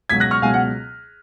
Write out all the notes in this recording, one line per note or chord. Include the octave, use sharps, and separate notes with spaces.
C#2 B2 F#3 G#6 B6
F#6 A#6
C#6 F6
C#2 B2 F#3 F5 G#5
F#5